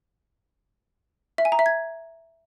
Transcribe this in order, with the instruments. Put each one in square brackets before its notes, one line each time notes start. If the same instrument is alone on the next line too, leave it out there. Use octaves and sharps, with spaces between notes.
[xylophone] E5
G#5
A#5
E5
G#6